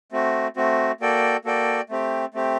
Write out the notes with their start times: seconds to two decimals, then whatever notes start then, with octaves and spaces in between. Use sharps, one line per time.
0.12 A3 C4 F#4
0.56 A3 C4 F#4
1.01 A#3 F#4 A4 D5 G5
1.45 A#3 F#4 A4 D5 G5
1.90 A3 C4 G4
2.34 A3 C4 G4